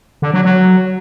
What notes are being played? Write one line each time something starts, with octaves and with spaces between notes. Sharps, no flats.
D3
F#3
F#3